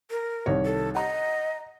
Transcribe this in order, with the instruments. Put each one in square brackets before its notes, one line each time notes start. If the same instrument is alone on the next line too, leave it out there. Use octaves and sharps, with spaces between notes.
[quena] A#4
[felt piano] C2 D#3 C#5
[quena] A4
[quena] D#5 [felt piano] F#5 A#5